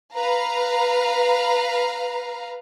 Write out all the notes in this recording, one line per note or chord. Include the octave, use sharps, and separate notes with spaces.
B4 F5 A#5